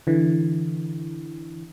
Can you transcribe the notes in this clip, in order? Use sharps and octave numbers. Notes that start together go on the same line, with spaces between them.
D3 E3